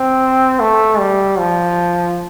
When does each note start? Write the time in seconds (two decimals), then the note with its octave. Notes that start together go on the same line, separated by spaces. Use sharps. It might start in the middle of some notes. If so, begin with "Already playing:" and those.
Already playing: C4
0.60 A3
0.99 G3
1.39 F3